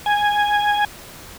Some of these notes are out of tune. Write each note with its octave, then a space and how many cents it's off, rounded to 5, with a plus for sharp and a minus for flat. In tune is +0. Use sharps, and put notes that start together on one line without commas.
G#5 -5